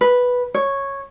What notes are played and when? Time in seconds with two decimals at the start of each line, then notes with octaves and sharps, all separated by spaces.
0.01 B4
0.54 C#5